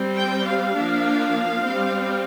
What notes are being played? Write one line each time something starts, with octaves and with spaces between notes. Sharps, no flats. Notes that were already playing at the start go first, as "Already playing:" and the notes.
Already playing: G3 C4
G5
F5
F3 A#3 D4
G3 C4